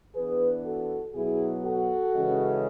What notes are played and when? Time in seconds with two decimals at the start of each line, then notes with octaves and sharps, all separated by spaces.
0.15 E3 B3 D4 G#4 B4
0.65 F#4 A4
1.14 B2 F#3 B3 E4 G#4
1.64 F#4 A4
2.14 C#3 E3 G#3 C#4